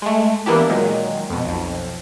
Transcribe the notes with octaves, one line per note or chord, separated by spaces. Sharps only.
G#3 A3
E3 A#3 B3 D4 E4 G4
A#2 D#3 F#3 G#3
F2 B2
B1 F2